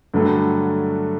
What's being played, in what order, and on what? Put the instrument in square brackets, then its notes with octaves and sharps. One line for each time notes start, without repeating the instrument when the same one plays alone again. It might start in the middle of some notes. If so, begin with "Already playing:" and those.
[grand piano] G2 D3 F#3 A3